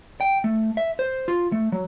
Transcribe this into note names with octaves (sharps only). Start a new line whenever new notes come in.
G5
A3
E5
C5
F4
A3
F#3